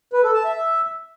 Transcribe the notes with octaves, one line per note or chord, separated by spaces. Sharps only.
B4
A4
A5
E5